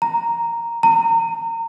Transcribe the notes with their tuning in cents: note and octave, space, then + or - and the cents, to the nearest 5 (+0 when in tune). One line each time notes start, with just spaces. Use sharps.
A#5 +0
A#5 -30